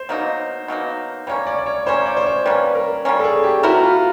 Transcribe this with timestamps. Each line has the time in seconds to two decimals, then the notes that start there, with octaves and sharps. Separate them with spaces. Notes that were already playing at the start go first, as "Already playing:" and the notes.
Already playing: C5
0.09 B2 F#3 A#3 D#4
0.68 B2 F#3 A#3 D#4
1.27 G3 A#3 C#4 C#5
1.46 D5
1.58 D5
1.66 C#5
1.86 G3 A#3 C#4 C5
2.06 D5
2.17 C5
2.26 C#5
2.46 G3 A#3 C#4 B4
2.75 A#4
3.05 G3 A#3 C#4
3.19 A4
3.24 G#4
3.44 G4
3.63 B3 E4 F#4 G4 A#4
3.83 F4